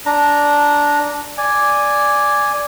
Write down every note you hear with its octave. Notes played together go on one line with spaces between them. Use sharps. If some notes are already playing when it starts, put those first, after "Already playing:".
D4 A#5
D5 G#5